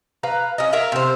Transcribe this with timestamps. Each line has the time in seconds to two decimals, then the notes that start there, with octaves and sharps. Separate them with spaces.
0.23 B4 F5 A#5
0.58 C#4 D#5
0.73 A#4 E5 F5 A#5
0.92 C3 C5